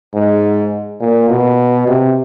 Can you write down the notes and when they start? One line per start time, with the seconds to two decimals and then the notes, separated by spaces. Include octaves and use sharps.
0.14 G#2
1.00 A#2
1.30 B2
1.87 C3